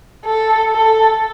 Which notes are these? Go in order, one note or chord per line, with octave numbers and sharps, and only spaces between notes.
A4
A4